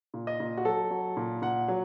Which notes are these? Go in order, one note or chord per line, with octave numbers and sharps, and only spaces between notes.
A#2
D#5
A#2
F#4
F#3 A4
F#3
A#2
A#2 F#5
F#3